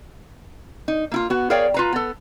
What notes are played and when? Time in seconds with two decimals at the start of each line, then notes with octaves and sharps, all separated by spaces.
0.88 D#4
1.12 A#3 E4 F4
1.30 B3 F#4
1.50 G#4 A#4 C#5 D5 F5 G5
1.74 F4 B4 A#5
1.92 B3 A4